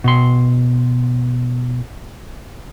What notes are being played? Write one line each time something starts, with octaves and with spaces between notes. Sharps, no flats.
B2 C6